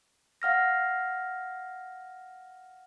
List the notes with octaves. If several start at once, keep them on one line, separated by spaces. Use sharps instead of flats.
F5 F#5 F6 A#6